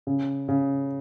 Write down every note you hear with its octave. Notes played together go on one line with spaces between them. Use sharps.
C#3
C#3